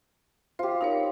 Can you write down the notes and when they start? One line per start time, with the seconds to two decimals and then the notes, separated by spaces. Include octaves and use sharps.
0.59 F4 G4 C5
0.81 D#4 A#4 C#5 B5 D6